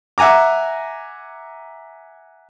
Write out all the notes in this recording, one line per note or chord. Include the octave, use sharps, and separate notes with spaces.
E5 F#5 G#5 A#5 D6